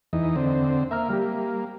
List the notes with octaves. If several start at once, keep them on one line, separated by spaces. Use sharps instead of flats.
E2 E3 D#4
D3 C4
A#3 E5 A#5 F6
G3 G4